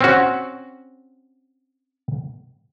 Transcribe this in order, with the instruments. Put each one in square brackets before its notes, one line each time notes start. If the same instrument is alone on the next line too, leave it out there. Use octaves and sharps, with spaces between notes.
[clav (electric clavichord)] C4 C#4 F#4